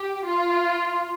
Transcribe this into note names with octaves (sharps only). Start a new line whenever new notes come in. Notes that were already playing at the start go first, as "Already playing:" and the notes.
Already playing: G4
F4